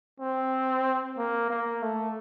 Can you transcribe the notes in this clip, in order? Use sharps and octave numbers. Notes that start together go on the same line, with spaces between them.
C4
A#3
A#3
A3